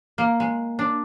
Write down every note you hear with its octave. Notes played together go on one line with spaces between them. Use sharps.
A#3
G#3
D4